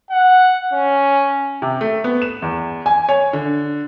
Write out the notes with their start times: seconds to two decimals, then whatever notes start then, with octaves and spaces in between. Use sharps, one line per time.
0.11 F#5
0.73 C#4
1.62 C3
1.81 A3
2.04 B3
2.22 E7
2.42 E2
2.86 G#5
3.09 C#5
3.33 D3